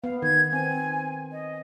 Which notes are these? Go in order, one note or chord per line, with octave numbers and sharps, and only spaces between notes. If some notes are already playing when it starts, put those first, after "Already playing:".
B3 F5
D#3 G#6
C4 G#5
D#5